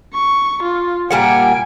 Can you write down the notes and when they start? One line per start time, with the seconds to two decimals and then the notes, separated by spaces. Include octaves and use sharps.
0.14 C#6
0.63 F4
1.11 A#2 G3 F#5 G#5 D7